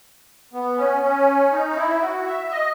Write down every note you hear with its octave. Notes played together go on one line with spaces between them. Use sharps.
B3
C#4
C#4
D#4
E4
F#4
E5
D#5